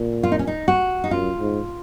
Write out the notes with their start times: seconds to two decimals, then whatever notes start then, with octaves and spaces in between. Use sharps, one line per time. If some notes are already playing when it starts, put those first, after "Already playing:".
Already playing: A#2
0.23 F4
0.32 D#4
0.39 C#4
0.47 D#4
0.68 F#4
1.04 D#4
1.11 F#2 F4
1.39 G#2